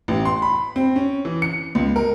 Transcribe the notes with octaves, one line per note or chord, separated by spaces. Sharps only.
A1
C6
B5
C4
C#4
E3
C#7
C#2
A#4